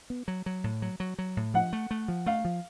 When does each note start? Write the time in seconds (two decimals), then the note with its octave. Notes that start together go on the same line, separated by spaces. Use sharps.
0.10 B3
0.28 F#3
0.46 F#3
0.64 A2
0.82 F#3
1.00 F#3
1.18 F#3
1.37 A2
1.54 F3 F#5
1.73 A3
1.91 A3
2.08 F3
2.26 A3 F5
2.45 F3